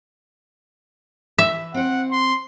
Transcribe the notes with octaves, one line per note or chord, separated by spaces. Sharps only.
E3 E5
C4 C5 F#5
C6